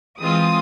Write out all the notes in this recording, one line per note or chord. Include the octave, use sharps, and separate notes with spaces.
E3 G#3 C4 F4 D#6